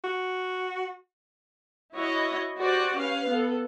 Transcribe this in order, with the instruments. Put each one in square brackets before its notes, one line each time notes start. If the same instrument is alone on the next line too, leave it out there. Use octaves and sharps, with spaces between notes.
[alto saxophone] F#4
[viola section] E4 F#4 C#5 D#5
F#4 G4 C5 D5
C#4 B4 F5
B3 A4